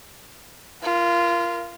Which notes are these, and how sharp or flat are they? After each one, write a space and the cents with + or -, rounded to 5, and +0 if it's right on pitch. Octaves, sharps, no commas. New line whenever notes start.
F4 -25 A#4 +10